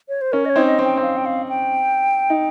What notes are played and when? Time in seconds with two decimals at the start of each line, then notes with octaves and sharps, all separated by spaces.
0.09 C#5
0.21 C5
0.32 C#4 A#4
0.45 D#5
0.50 C#5
0.56 C4 D#4
0.67 D#5
0.79 C4
0.85 G5
0.97 C4 F5
1.17 G5
1.26 F5
1.49 G5
2.30 D#4